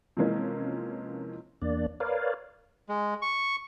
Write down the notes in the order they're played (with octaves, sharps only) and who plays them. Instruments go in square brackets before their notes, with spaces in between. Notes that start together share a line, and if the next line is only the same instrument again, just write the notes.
[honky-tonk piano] C3 E3 F3 G#3 A#3 C#4
[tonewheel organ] E2 A#3 D4 D5
A#4 B4 C#5 D5 F5
[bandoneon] G#3
C#6